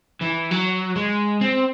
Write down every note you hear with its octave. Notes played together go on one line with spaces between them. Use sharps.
E3
F#3
G#3
C4